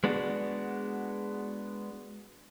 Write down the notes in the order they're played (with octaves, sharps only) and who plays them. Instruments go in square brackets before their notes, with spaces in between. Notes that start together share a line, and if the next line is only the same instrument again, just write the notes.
[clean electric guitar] G#3 B3 D4 F#4